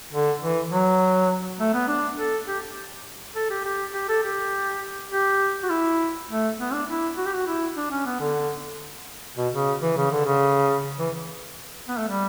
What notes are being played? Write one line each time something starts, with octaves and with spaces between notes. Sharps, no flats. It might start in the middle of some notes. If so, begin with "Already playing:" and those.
D3
E3
F#3
A3
B3
D4
A4
G4
A4
G4
G4
G4
A4
G4
G4
F#4
E4
A3
B3
D4
E4
F#4
G4
F#4
E4
D4
C#4
B3
D3
B2
C#3
E3
C#3
D3
C#3
E3
B3
A3
G3